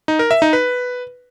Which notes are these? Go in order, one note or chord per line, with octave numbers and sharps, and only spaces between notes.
D#4
A#4
E5
D#4
B4